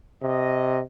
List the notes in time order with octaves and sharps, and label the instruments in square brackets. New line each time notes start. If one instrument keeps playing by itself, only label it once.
[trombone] C3 [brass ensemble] D#5